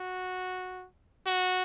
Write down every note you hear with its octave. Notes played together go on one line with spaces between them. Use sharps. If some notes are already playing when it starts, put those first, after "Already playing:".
Already playing: F#4
F#4